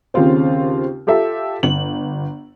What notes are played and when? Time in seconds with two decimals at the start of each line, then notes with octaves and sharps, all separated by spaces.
0.14 D#2 C#3 C4 F4 C5
1.07 F4 G4 A4 E5
1.63 G1 F#7